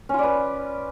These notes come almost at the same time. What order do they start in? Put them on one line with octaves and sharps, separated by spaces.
C#4 F4 D5 B4